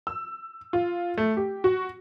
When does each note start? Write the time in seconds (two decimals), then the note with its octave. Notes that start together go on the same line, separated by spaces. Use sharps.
0.07 E6
0.73 F4
1.18 A3
1.37 G4
1.64 F#4